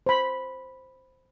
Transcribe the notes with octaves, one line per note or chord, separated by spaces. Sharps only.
C5 B5